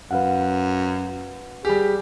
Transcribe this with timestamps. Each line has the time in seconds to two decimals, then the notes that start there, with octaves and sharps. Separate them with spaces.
0.11 F#2 B4 F5 F#5
1.65 G3 G4 G#4